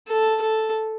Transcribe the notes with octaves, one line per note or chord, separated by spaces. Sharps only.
A4
A4